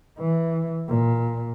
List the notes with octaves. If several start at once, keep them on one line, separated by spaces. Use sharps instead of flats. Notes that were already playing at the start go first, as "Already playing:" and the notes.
E3
A#2